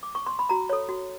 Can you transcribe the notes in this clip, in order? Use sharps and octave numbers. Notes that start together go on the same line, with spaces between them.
D6
C#6
C6
B5
F#4 A#5
A4 C#5
F#4